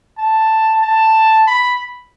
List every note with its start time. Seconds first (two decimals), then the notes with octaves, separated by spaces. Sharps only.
0.18 A5
0.83 A5
1.47 B5